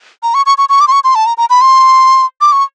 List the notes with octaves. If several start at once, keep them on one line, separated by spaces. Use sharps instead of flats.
A#5
C#6
C#6
C#6
C#6
D6
C6
C#6
C6
A5
A#5
A#5
B5
C6
D6
C#6